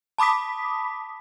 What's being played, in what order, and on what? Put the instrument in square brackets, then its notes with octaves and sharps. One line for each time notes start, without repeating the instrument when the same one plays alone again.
[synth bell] A5 B5 D6 D#6 B6